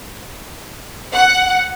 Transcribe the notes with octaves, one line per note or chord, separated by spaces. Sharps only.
F#5